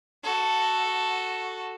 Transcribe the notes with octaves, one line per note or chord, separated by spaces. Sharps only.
F#4 A4